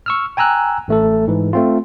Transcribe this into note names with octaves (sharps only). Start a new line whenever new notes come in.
C#6 E6 F6
G5 G#5 A#5 E6 F#6
A1 A3 A4
G#2 E3
A3 C4 F4